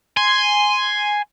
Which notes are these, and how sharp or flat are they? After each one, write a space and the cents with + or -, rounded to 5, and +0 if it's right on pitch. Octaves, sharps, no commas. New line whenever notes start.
G#5 +0 C6 +0